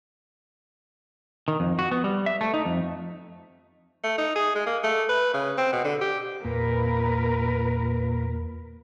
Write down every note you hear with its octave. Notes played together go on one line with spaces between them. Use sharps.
D#3
F2
F#4
B3
G3
E5
A3
D#4
F2
A3
D#4
G#4
G#3
A#3
A3
B4
C#3
C4
B2
D3
G4
E2 A#2 A#4 B4